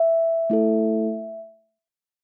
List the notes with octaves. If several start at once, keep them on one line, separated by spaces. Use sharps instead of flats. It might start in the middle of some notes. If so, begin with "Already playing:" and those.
Already playing: E5
A3 E4 A4